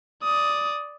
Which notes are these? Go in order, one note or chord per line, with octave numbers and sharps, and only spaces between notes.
D5 D#6